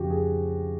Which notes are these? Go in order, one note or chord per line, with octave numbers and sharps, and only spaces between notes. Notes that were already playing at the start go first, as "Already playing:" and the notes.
Already playing: F2 C#3 F3 F#4 G4
G#4